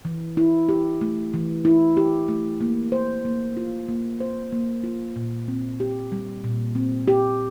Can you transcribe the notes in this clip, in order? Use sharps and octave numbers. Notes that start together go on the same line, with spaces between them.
E3
E4
G4
A3
E3
E4
G4
A3
A#3
C5
A#3
F4
A#3
C5
A#3
F4
A#2
C4
G4
G3
A#2
C4
G4